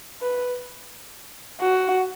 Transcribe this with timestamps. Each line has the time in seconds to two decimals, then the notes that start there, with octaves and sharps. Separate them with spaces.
0.21 B4
1.60 F#4